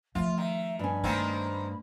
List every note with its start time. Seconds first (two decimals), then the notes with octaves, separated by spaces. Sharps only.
0.15 F3 A3 F4 E5
0.38 D#3 E5
0.79 G2 C#4 B5
1.04 D#3 A3 A#3 C4